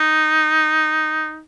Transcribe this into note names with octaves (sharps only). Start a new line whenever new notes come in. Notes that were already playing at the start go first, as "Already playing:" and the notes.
Already playing: D#4